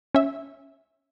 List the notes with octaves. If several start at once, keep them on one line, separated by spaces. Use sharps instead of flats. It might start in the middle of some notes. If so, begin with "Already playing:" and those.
C#4 E5